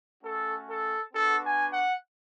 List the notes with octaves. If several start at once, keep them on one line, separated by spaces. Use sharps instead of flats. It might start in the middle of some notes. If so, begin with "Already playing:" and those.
A3 C#4 F#4 A4
A4
B3 D4 F#4 A4
G#5
F#5